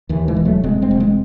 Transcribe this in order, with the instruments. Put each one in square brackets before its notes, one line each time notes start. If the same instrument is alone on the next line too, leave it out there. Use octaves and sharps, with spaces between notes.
[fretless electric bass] D#2 E3
E3 G#3
E1
F#3 A3
E1 G#3 C4
G#3 C4
E1
G#3 C4